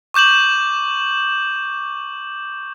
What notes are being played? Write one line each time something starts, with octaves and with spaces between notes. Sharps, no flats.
C#6 D6 G6 E7 F#7